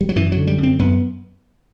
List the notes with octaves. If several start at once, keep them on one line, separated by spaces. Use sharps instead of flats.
G3
F#3
F#2 E3
F#3
D3
G3
F#2 C4
F#2 B3